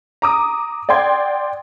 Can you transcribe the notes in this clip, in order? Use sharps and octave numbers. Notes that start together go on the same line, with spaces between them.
A#5 D6 D#6
D5 F#5 G5 C6 G#6